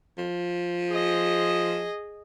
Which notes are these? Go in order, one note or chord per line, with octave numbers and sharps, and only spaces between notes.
F3
G#4 D#5